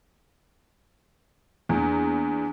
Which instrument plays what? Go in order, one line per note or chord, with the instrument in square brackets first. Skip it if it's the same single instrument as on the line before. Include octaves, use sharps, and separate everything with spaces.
[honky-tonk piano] E2 [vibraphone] A#3 D4 G#4